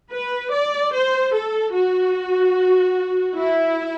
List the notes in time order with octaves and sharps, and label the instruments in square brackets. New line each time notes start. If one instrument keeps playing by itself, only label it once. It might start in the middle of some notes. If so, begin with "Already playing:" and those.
[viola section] B4
D5
C5
A4
F#4
E4